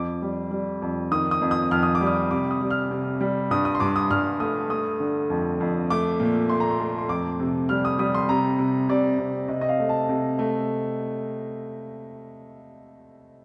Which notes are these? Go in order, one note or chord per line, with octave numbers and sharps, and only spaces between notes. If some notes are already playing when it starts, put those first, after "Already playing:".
Already playing: F2 D6
G3
G3
F2
D#3 D#6
D#6
F2
D#6
F2 F6
D#6
D6
G3
D#6
C3 D6
D#6
G3
F6
C3
G3
G2 D#6
D#6
C6
G2 D6
D#6
G2 F6
A3 D#6
A3 D#6
D3
F2
F2
A3 D6
A#2
A3 C6
A#5
C6
A3
C6
F2 D6
C3
G3 F6
D#6
G3 D#6
C6
C3 A#5
C3
C3 D5
C3
C3 D#5
D#5
F5
A3
A5
C3
A3